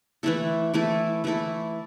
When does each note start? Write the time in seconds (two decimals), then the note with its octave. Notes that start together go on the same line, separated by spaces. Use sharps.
0.23 E3 A3 E4 A4
0.74 E3 A3 E4 A4
1.24 E3 A3 E4 A4